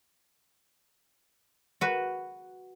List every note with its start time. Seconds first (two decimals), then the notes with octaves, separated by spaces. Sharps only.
1.81 F#4 B4